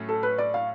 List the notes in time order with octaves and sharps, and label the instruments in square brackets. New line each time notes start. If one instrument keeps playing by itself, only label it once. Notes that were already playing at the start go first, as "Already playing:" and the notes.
Already playing: [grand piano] A2 F#3 A3 C#4
[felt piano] A4
B4
D5
F5